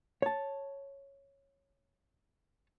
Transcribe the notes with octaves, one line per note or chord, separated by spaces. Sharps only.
C#5 A5